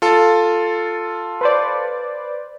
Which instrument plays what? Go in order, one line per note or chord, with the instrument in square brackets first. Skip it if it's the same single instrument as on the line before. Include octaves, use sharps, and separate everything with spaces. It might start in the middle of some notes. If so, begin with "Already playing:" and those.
[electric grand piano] F4 A4
[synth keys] B4 C5 D5